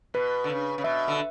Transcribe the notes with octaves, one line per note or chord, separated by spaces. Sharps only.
B2 B4
D3
C#3
C#3
B2 E5
D3